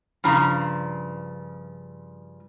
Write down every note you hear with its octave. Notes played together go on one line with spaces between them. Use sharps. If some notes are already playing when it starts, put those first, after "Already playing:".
G2 C#3 F3 A#5